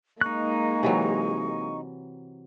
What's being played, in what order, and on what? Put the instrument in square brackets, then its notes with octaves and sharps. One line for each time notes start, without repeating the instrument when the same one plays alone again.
[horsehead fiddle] G#3 A#3 [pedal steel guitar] D#4 F#6 [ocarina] C#6
[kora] C3 E3 F#3